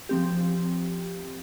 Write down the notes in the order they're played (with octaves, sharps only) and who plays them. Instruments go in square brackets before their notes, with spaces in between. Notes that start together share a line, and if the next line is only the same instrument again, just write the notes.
[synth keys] F3 C4 G4